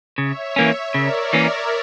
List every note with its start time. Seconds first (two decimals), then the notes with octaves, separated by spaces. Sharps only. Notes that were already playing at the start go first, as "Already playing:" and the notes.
0.18 C#3 C#5 E5
0.56 E3 A#3 C#4
0.94 C#3 A#4 D5
1.33 E3 A#3 C#4